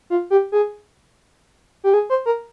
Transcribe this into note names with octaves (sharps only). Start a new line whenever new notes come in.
F4
G4
G#4
G4
G#4
C5
A#4